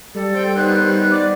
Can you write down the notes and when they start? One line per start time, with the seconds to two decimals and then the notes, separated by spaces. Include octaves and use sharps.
0.15 G3 A4
0.35 C5 G5
0.56 D#3 B3 C5 F#6
1.11 D5 D6